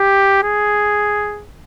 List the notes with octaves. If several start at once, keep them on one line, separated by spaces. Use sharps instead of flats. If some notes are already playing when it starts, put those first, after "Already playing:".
Already playing: G4
G#4